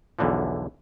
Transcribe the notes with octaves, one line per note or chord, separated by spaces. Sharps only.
B1 E2 D3 E3 F3